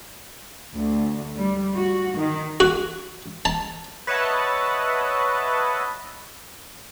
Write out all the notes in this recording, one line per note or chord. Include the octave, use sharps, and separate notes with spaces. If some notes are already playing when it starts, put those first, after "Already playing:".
D2
G3
F#4
D#3
F#4
A5
B4 C#5 D#5 E5 F#5 A5